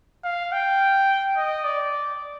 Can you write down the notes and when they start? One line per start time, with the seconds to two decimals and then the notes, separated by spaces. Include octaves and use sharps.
0.24 F5
0.53 G5
1.37 D#5
1.65 D5